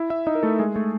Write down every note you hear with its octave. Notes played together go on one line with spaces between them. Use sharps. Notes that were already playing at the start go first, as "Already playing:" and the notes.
Already playing: E4 E5
E4 E5
D#4 D#5
A#4
A3 A4
G#3 G#4
A3 A4